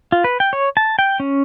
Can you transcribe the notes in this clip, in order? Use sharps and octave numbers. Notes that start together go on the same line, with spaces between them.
F4
B4
G5
C#5
A5
G5
C#4